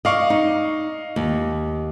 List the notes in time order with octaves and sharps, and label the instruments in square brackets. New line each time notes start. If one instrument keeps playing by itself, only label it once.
[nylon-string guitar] D5 [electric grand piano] D#5 F5 C#6
[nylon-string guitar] D#4
D#2